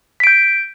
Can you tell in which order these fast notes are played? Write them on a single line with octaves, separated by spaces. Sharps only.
B6 D7 G6